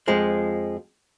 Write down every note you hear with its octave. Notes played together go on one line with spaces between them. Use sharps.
F2 F3 G#3